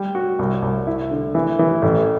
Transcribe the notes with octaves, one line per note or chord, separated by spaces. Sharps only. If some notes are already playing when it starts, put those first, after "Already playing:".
Already playing: G3
F#4
C2
C2
E4
D3
E3
E3
A1